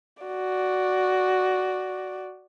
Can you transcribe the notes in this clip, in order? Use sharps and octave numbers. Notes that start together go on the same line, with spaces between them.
F#4 D5